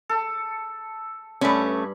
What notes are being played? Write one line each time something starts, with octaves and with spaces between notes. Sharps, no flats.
A4
G2 A3 C#4 B5